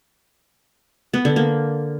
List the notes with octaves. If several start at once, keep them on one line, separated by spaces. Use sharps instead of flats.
B3
D3
A#3